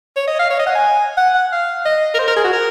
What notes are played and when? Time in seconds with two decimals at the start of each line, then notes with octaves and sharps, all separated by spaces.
0.16 C#5
0.28 D#5
0.39 F5
0.50 C#5
0.59 D#5
0.67 F#5
0.75 G#5
1.18 F#5
1.35 F#5
1.52 F5
1.86 D#5
2.15 A#4
2.19 C5
2.28 A#4
2.37 G#4
2.45 F#4
2.53 A#4